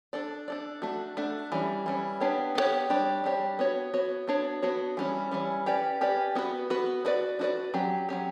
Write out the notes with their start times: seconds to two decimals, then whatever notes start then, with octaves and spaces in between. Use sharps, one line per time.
0.13 D4 A4 D5
0.48 D4 A4 D5
0.82 A3 D4 F#4
1.17 A3 D4 F#4
1.52 E3 G3 C#4
1.86 E3 G3 C#4
2.20 B3 D4 G4 C#5
2.55 B3 D4 G4 C#5
2.90 G3 D4 G4 C#5
3.24 G3 D4 G4 C#5
3.59 B3 F#4 C#5
3.93 B3 F#4 C#5
4.27 B3 D4 F#4 C#5
4.62 B3 D4 F#4 C#5
4.97 E3 G3 C#4
5.31 E3 G3 C#4
5.66 C#4 G4 B4 D5
6.01 C#4 G4 B4 D5
6.35 B3 F#4 B4
6.70 B3 F#4 B4
7.05 D4 F#4 B4 D5
7.39 D4 F#4 B4 D5
7.74 F#3 C#4 G4
8.09 F#3 C#4 G4